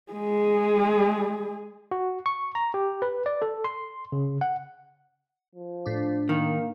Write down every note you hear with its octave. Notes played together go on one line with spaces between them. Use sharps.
G#3 G#4
F#4
C#6
A#5
G4
B4
D5
A4
C6
C#3
F#5
F3
A2 D4
D#3 A#3